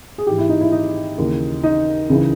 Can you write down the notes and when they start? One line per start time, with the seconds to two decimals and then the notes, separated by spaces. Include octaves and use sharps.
0.18 G#4
0.27 G#2 E3 G4
0.38 E4
0.49 D#4
0.61 E4
0.72 D#4
1.18 D#2 C#3 E3
1.63 D#4
2.10 C#2 C#3 E3